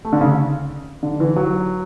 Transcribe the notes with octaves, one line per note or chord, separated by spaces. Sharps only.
A3
D3
C#3
D3
E3
F#3